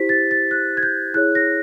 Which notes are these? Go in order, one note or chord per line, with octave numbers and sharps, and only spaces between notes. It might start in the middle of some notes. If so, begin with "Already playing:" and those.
Already playing: E4 G4 C5 B6
A6
A6
F#6
G#6
G6
E4 G#4 C#5 F#6
A#6